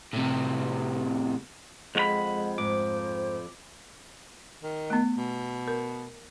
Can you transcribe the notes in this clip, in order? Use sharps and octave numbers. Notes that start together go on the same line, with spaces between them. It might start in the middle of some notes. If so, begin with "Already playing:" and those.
A2 C3
F2 G#3 F#4 F#5 B5
G#2 C5 D6
D#3
A3 B3
B2
A#4